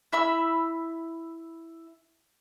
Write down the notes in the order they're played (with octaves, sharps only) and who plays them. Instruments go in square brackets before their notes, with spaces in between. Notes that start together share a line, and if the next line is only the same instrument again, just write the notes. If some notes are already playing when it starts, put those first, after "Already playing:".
[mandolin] E4 E5 B5 E6